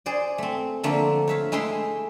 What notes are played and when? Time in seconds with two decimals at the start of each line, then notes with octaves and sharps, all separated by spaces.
0.06 G#4 C5 D5
0.38 A3 C4
0.83 D3 F3 A3 A#3
1.27 C#5 E5 F5
1.52 G#3 A3 E4 E5 G5 C6